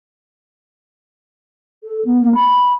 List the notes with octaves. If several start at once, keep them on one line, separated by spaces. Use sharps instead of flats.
A4
B3
A#3
B5